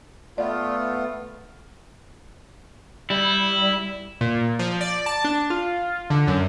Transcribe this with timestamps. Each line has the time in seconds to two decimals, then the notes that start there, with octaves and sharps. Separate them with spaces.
0.38 A3 B3 F4 D5
3.10 G3 E4
4.21 A#2
4.59 F3
4.81 D5
5.06 A5
5.24 D4
5.50 F4
6.10 D3
6.27 F#2